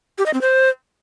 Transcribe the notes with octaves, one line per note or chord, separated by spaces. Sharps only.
G4
D#5
C4
C5